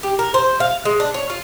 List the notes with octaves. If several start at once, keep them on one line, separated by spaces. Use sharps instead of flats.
G4
A#4
C5
F5
G#3
D4
C#5
F4